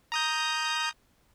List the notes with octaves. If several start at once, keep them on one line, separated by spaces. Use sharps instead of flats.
A#5 D#6 G6